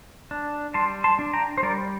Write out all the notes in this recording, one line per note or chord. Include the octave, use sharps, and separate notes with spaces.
D4
G3 A5 C6
A5 C6
D4
G5 A#5
C5
G3 A#4 D5